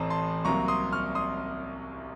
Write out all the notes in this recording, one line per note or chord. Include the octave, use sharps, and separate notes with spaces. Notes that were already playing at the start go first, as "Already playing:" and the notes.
Already playing: A1 A2 A3 C4 A5 A#5
A5 C6
C2 C3 F#3 A#3 A#5 C#6
C6 D#6
C#6 F6
C6 D#6